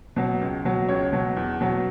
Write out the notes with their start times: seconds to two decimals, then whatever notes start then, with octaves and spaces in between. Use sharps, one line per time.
0.16 B2 F#3
0.41 C#2
0.65 B2 F#3
0.88 C#2 C#5
1.12 B2 F#3
1.36 E2
1.61 B2 F#3